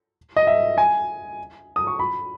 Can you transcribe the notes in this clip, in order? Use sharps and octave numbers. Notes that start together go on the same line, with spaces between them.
D#5
E5
G#5
D#6
C#6
B5